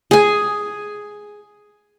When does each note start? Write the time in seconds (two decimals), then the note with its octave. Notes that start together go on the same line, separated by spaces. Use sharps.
0.11 G#4 G#5